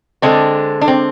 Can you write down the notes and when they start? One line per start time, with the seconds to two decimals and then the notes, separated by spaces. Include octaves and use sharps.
0.22 D3 G#3 C4 D4
0.81 D4
0.88 C4